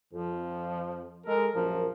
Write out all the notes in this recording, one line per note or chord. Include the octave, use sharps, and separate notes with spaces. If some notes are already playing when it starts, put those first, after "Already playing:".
F2 F3
G#3 A4 A#4
A#1 F#2 F3 A#4